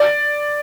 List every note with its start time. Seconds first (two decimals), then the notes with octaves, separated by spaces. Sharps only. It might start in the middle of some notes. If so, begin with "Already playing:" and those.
Already playing: D5